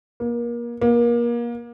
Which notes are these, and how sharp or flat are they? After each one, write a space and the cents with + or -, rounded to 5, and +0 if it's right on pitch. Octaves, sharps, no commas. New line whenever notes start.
A#3 +30
A#3 +30